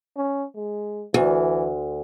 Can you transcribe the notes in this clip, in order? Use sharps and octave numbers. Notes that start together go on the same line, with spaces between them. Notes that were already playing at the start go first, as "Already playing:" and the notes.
C#4
G#3
D2 E3